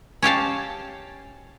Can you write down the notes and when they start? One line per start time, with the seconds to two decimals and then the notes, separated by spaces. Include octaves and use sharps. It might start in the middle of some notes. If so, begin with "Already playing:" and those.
0.22 C#4 G4 F5 A5